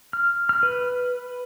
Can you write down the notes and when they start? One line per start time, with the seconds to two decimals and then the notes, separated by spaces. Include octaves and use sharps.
0.13 F6
0.49 F6
0.63 B4